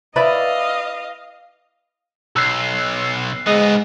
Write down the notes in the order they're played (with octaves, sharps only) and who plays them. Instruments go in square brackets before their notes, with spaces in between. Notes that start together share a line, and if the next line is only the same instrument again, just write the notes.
[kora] E4 B4 D5 [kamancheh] D#5 F5
[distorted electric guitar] B1 [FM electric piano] E6 F#6 C7
[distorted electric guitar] G#2 B3 [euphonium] G#3 [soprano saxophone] D#5